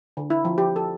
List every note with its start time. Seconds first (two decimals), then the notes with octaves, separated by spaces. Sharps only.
0.17 D3
0.30 E4
0.45 F3
0.58 G4
0.76 A4